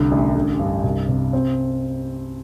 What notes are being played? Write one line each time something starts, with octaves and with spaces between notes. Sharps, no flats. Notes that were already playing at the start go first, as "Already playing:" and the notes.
Already playing: C2 D3
A1
D3
G2
C2
C3
C4